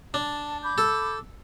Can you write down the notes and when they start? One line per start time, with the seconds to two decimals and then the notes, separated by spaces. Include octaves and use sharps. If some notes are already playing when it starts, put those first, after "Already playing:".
0.14 D4 A5
0.63 B5 D6 G6
0.78 A4